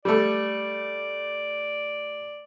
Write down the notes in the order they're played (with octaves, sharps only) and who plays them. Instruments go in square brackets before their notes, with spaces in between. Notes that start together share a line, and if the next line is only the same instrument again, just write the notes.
[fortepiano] G3 A3 [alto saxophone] D5